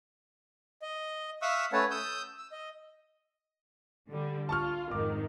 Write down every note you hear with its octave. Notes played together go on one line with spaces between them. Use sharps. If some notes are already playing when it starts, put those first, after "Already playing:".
D#5
E5 F5 C#6 D#6 E6 F#6
A3 C#4 B4 C#5 F#5 A5
D#6 E6 G6
E6
D#5
D3 G3
F4 A5 C#6 F6
F2 G#2 D#3 D6